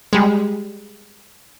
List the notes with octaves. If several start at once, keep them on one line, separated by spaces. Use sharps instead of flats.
G3 G#3